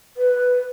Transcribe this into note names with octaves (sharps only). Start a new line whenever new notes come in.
B4